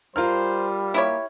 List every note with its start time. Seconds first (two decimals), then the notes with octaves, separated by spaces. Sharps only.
0.16 G3 F4 A#4 C5 F6
0.94 A#3 E4 G4 C#5